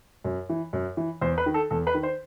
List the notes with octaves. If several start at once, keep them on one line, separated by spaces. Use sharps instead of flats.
F#2
E3
F#2
E3
E2 C5
B4
D#3
A4
E2 A4
B4
D#3
C5